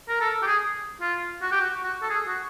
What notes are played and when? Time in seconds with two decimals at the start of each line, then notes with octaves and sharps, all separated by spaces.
0.09 A#4
0.21 A4
0.42 G4
0.47 G#4
1.01 F4
1.42 F#4
1.52 G4
1.61 F#4
1.83 F#4
2.02 A4
2.10 G#4
2.28 F#4